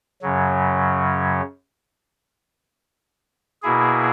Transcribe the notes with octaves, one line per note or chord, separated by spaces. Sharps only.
F#2 C#3 F#3
B2 A#3 E4 G#4